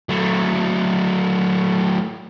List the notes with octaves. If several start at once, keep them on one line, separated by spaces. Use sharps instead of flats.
F#3 A3